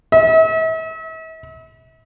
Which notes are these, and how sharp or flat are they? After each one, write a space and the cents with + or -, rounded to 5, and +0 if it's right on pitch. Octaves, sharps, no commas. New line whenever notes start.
E5 -40